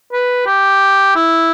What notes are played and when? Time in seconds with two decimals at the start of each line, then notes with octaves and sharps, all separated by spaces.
0.12 B4
0.46 G4
1.16 E4